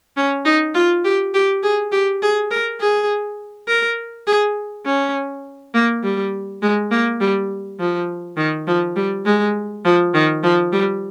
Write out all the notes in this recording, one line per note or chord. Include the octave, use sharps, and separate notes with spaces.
C#4
D#4
F4
G4
G4
G#4
G4
G#4
A#4
G#4
A#4
G#4
C#4
A#3
G3
G#3
A#3
G3
F3
D#3
F3
G3
G#3
F3
D#3
F3
G3